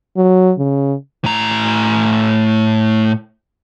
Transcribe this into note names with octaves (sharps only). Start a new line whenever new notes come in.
F#3
C#3
A2 A#5